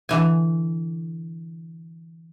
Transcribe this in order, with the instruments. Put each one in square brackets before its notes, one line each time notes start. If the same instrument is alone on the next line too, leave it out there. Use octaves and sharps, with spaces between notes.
[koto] D3 E3 G#5